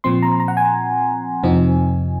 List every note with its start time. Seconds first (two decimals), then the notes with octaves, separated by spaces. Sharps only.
0.04 A#2 F3 C4 C6
0.23 A#5
0.40 A#5
0.48 F#5
0.57 G#5
1.43 F2 C3 F3 C4 D#4